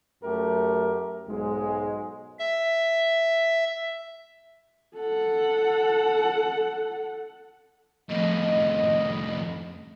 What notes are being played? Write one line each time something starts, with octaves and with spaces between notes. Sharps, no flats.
F#2 A3 G4 A#4
B1 G#2 G#3
E5
A4 F#5
F2 A2 D#5